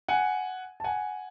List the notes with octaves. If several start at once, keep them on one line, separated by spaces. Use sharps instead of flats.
F#5 G#5
A5
F#5 G#5